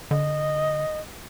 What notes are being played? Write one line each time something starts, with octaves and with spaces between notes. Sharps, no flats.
D3 D#5